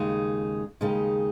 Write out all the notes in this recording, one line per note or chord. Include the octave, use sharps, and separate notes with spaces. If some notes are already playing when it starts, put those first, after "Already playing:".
Already playing: D#2 C#3 G#3 D#4
D#2 C#3 G#3 D#4